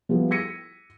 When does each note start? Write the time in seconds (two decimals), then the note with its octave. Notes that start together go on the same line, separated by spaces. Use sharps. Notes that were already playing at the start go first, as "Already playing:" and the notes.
0.09 F3 G3 B3 E4
0.31 E6 G#6 A#6 B6 C#7 D#7